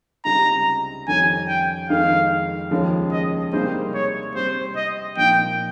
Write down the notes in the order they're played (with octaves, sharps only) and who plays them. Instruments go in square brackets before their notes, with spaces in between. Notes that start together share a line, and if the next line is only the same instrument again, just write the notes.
[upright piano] C#2 C3 G3 C4 D#4 [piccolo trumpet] A#5
[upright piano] F2 D#3 G3 C#4 [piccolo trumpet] G#5
[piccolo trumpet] G5
[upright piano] F2 D#3 G#3 D#4 [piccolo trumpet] F5
[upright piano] D#2 C#3 F3 G#3 C#4
[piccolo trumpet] D#5
[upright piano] C3 G3 A#3 D#4 G#4 [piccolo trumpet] C5
[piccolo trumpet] C#5
[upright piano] C3 G3 C4 [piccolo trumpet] C5
[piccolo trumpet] D#5
[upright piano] A#2 F3 A#3 D#4 [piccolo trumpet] G5